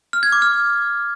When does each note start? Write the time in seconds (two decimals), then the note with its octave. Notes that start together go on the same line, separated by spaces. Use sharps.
0.13 F6
0.23 G#6
0.32 D6
0.42 F6